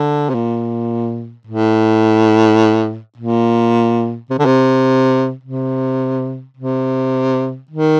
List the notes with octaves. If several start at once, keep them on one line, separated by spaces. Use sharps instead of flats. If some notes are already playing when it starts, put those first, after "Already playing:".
Already playing: D3
C3
A#2
A2
A#2
C3
D3
C3
C3
C3
D#3